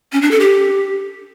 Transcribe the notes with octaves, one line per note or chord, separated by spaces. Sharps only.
C#4
D4
A4
G4